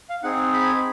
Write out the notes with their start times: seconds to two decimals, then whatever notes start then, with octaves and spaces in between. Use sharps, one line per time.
0.09 F5
0.23 C4 D#4 G#4 F#5
0.53 B5